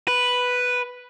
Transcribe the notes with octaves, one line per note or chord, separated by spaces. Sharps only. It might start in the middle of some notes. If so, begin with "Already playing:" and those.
B4